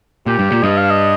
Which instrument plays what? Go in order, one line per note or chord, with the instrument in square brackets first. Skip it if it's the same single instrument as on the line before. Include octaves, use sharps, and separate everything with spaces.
[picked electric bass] A#2 [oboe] G4
[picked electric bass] G2
A#2
[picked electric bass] G2 [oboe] D#5
[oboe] F5
D#5